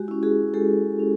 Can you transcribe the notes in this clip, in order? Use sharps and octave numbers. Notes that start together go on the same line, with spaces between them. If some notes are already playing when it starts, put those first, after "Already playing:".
Already playing: G#3 F#4 G4
C#4 E4
F#4 G#4
G#3 G4 A4
C#4